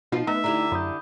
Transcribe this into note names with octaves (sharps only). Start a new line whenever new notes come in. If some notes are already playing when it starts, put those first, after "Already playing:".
B2 F3 D#4 F4
A3 B3 D#4 E5
D3 E4 G4 A#5
F#2 B5 D#6 G6